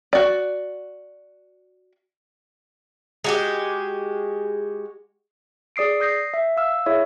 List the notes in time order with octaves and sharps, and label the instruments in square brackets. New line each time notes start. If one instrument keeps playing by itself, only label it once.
[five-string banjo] F#4 D5
[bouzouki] G#3 F#4 G4
[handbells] G#4 D5 D#6 C7 D7
D#6 G6 A#6 C7
E5
F5 E6 F6
E4 G#4 C#5 E5